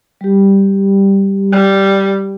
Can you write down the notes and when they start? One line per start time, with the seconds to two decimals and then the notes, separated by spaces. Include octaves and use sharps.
0.21 G3 G4
1.52 G3